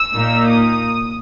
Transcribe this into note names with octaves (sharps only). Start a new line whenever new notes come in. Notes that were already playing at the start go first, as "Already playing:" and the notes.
Already playing: E6
A#2 A#3 D#4
D#6